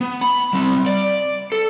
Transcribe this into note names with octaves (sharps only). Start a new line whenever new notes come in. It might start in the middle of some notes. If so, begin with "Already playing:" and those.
B3
B5
G3 C4
D5
A4